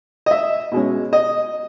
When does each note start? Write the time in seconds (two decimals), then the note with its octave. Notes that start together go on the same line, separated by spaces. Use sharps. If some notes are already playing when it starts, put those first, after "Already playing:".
0.26 D#5
0.31 E5
0.72 B2 G#3 C#4
1.13 D#5